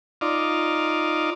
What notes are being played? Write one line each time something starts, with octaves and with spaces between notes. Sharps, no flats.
D#4 F4 D5